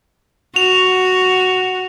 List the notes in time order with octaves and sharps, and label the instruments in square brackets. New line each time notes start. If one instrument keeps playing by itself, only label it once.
[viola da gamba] F#4 [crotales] F7